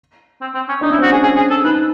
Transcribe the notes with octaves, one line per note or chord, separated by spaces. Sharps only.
C4
C4
C#4
D4 D#4
C#4 E4
C4
F#4
C#4
G#4
G#4
G#4
A4
D#4 B4